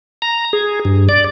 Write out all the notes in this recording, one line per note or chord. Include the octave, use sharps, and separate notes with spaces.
A#5
G#4
G2
D5